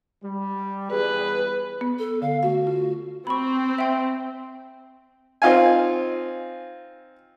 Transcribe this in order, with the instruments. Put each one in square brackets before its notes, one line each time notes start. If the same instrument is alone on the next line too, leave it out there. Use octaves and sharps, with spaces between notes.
[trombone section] G3
[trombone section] E2 G3 G#4 [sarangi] B4
[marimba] B3
[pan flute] A4
[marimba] D3 [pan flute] F5
[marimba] A3 F5 [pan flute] F#4
[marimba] F4
[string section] C4 [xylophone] B5 C#6
[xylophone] E5 G5
[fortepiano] C4 D#4 F4 F5 G#5